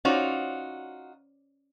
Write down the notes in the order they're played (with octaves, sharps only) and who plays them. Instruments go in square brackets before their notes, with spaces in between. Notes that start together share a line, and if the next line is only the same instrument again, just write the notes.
[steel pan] C#4 C5 D5 [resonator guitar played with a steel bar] D#4 F4 F#4